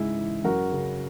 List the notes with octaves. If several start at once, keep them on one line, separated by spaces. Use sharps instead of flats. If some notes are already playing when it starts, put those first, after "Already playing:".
Already playing: G#2 C#3 E4 G#4
E3
F#2 F#4 A#4
C#3